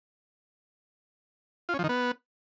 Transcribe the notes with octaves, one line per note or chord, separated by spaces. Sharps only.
F4
C#4
F3
D#3
B3